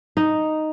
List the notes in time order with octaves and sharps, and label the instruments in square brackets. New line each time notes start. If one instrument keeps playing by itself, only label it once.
[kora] D#4